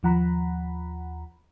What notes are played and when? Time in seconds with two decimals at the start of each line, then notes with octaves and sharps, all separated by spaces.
0.03 D#2 F3 F#5 A#5 B5